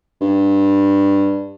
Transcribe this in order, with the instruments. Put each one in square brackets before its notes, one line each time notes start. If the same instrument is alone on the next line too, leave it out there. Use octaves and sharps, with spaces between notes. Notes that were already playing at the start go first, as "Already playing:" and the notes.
[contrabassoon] G2